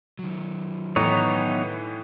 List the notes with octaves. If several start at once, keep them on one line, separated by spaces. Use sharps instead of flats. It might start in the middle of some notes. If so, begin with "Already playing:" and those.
D#3 F#3
A2 E3 B3 D#4 C#5